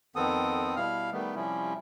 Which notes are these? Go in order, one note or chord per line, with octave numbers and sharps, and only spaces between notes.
F2 D#3 B3 C4 A4 D#6
B2 G3 E4 F5 F6
D#3 G3 A3 B3
C3 F3 G3 C#4 E4